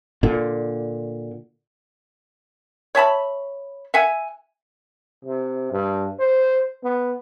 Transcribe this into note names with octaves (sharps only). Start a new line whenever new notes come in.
A#2 D3
C#5 E5 A5 B5
E5 F#5 G#5
C3
G2
C5
B3